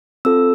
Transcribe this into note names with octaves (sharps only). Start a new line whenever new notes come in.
C4 F4 A4 E6